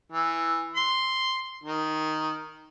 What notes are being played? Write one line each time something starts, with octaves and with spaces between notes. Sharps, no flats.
E3
C6
D#3